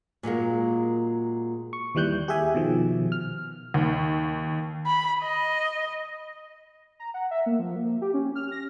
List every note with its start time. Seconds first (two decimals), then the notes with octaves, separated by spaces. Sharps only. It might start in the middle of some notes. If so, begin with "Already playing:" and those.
0.23 A#2 F#3 G#3 A#3
1.73 C#6
1.95 D#2 E3 G3 F#6 G6
2.28 G4 G#4 E5 G#5
2.55 B2 D#3 F3
3.12 F6
3.74 D#2
4.86 B5
5.22 D#5
7.00 A#5
7.14 F#5
7.31 E5
7.46 A#3
7.59 F3
7.76 A#3
8.01 G4
8.14 C#4
8.36 F6
8.52 A#6